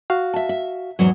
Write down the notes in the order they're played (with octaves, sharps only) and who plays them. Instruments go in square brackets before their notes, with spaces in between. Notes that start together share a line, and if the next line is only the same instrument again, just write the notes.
[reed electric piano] F#4 F5
[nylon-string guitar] E5 A5
E5
E2 G#2 F#3